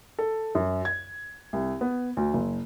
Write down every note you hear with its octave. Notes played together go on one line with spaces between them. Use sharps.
A4
F#2
G#6
C2
B3
D2
F#1